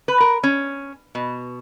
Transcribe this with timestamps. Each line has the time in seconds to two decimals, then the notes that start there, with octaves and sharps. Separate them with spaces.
0.08 B4
0.20 A#4
0.43 C#4
1.15 B2